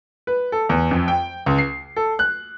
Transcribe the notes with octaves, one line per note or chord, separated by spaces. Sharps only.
B4
A4
E2
F2
G5
C#2
C7
A4
F#6